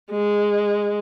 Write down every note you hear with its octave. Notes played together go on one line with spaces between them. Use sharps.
G#3